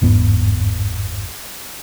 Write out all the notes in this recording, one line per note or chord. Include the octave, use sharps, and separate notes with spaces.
G1 E2 G#2 B3